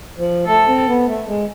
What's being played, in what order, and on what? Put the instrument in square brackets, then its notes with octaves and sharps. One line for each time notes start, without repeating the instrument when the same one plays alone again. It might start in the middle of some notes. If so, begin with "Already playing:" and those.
[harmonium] F3
[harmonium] A3 [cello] A4
[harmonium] C4
B3
A3
G#3